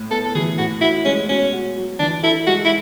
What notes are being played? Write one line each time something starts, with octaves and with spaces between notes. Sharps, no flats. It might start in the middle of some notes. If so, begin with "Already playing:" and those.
Already playing: A2
B3 A4
A4
E3 G#4
A2 F#4
E4 F#4
G#3 C#4
B2 C#4
F#4
F#3
E3 D4
E4 A4
G#3 F#4
E4